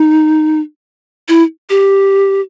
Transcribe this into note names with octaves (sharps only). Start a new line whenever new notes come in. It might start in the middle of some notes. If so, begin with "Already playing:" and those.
Already playing: D#4
E4
G4